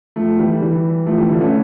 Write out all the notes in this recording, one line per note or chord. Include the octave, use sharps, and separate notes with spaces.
F3 A3
E3 G3
E3 G3
F3 A3
E3 G3
D3 F3
A3 C#4